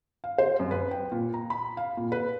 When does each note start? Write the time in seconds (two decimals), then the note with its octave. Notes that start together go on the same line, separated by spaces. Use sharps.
0.24 F5
0.38 C5
0.59 F#2
0.71 B4
0.91 G5
1.12 A#2
1.34 A#5
1.50 B5
1.77 F5
1.97 A#2
2.12 B4